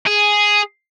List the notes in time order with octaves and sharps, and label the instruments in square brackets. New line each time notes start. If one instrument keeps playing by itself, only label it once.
[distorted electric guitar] G#4